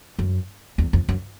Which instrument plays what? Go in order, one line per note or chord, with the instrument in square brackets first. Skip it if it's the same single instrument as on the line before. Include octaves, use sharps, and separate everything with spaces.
[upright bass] F#2
E2
F2
F#2